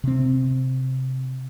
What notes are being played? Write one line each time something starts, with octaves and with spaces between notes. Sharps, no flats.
C3 C4